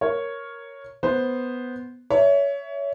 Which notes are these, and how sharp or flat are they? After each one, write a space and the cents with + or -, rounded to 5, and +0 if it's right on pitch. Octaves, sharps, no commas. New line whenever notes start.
A#4 +0 C#5 +0
B3 +0 C5 +0
C#5 +25 E5 +0